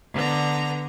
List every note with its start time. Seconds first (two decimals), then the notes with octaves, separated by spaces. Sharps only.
0.13 D3 B3 A#5